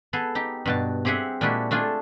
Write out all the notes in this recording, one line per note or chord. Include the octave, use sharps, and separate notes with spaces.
B3 G#4 A4
D#4 G4
G2 B2 A5
C4 G4 G#4 E5 F#5
A#2 G#3 D4 E4 F#4 G4
A3 D4 F4 G#4 A4